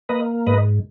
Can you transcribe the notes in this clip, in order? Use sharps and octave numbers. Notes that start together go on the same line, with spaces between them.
A#3 B4 D#5
G#2 B4 D#5